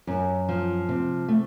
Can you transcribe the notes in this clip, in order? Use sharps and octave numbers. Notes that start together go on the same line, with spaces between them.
F#2
F3
C3
A3